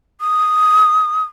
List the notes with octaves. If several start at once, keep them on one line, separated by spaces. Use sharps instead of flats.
D#6